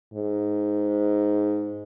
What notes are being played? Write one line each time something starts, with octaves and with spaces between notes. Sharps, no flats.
G#2